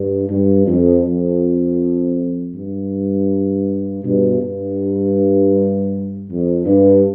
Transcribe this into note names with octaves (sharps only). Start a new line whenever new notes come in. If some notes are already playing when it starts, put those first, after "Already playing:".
Already playing: G2
G2
F2
F2
G2
G2 B2
G2
F2
G2